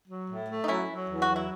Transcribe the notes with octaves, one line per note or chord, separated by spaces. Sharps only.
F#3
A2
A3
D#4
F#3 C#4 E4
F#3
E2
F#4
F#3
E4